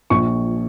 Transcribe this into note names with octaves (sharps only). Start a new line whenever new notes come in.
A#1 C#6